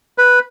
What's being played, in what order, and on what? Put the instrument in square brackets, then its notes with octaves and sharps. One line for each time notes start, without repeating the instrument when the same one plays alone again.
[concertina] B4